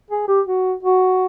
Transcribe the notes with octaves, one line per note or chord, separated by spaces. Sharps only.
G#4
G4
F#4
F#4